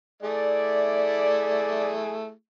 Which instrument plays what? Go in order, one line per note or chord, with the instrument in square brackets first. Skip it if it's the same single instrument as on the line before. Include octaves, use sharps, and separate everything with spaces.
[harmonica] A3 E4 G#4 [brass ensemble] D5